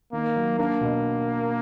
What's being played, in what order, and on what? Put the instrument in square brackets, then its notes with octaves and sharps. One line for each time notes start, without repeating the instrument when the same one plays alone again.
[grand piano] D#3 [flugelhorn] A#3
[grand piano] F#3
[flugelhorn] A#3 [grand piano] D4
[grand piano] B2